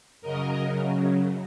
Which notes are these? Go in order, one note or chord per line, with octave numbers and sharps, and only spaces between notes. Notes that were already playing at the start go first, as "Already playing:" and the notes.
F#2 C#3 F#3 A#4 D#5